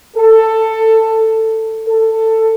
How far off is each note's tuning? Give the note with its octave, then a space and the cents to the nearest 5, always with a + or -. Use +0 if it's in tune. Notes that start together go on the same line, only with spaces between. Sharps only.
A4 +15
A4 +15